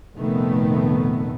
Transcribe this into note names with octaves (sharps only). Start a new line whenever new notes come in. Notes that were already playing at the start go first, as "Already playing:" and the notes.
F1 A#2 D#3 A3 B3